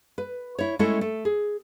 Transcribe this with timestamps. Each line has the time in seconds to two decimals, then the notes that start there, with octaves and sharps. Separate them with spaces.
0.18 B4
0.58 E4 C#5
0.79 G#3 A3 C#4 E4 A4
1.01 A3
1.25 G#4